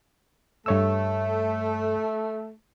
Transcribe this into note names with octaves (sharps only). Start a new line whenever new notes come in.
G2 A3 C#5 E6